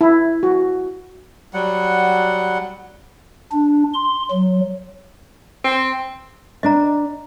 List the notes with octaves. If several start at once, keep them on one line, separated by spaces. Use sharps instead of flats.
E4
F#4
F#3 G3 F#5
D4
C6
F#3
C4
D4 B4 D#5 A#5